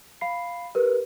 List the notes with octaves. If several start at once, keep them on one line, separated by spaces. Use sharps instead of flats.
F5 B5 C7
G4 A#4 B4